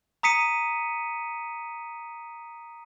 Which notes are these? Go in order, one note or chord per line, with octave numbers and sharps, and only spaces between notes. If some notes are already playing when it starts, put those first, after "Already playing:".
A#5 D#6 B6 C#7 D#7